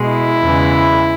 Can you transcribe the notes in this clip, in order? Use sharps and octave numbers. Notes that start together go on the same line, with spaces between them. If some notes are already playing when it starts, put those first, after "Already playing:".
Already playing: B2 G#3
E4
E2 C#3 E3 G#3